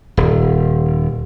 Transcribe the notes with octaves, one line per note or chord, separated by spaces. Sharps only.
D#1